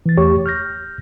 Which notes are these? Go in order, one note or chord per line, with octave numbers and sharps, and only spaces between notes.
E3 A6
E2 A3 G4 C#5 C#6
F6 G6 A#6